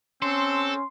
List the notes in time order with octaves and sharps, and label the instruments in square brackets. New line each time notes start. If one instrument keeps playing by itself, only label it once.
[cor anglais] C4 [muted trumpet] C#4 [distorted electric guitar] A4 [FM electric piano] C6